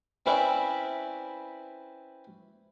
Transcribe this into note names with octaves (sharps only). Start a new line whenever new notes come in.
C4 C#4 E4 B4 D5 E5